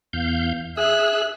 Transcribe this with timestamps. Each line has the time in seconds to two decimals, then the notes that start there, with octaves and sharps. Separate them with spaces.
0.13 E2 F5 G6
0.77 G#4 E5 E6 F#6